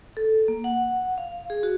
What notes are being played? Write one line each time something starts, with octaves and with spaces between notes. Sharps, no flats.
A4
A#3
F#5
F5
G#4
F#4